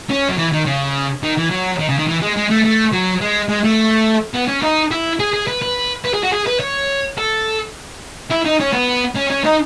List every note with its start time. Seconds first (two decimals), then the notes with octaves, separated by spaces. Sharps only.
0.10 C#4
0.29 F#3
0.38 E3
0.52 D#3
0.66 C#3
1.23 D#3
1.37 E3
1.51 F#3
1.79 D#3
1.89 C#3
1.98 D#3
2.08 E3
2.22 G#3
2.36 G#3
2.50 A3
2.64 A3
2.93 F#3
3.21 G#3
3.49 G#3
3.64 A3
4.34 B3
4.48 C#4
4.63 D#4
4.91 E4
5.20 G#4
5.34 G#4
5.47 B4
5.62 B4
6.05 B4
6.14 G#4
6.23 F#4
6.32 G#4
6.47 B4
6.60 C#5
7.18 A4
8.30 E4
8.45 D#4
8.60 C#4
8.73 B3
9.15 C#4
9.30 C#4
9.44 D#4